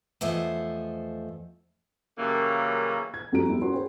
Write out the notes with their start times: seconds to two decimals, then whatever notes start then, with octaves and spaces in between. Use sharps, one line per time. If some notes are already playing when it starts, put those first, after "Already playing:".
0.21 E2 F3 A3 C5 D#5
2.18 F#2 C#3 E3 G3 A#3
3.14 G#6
3.32 F2 G3 F#4 A#5 D7
3.48 G3 B3 E4 G4
3.61 C#4 F#4 A#4 F#5 C6
3.73 G#4 B4 C5 G5